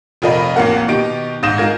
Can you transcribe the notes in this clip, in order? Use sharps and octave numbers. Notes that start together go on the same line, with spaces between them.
F1 F3 F4 A#4 D#5 B5
A1 F2 A#3 F4 A#4 F#5
B2 D#3 D#4 G4 D7
G#2 F5 D#6 G6 A#6 E7
G#3 D#4 F4 A#4 G#6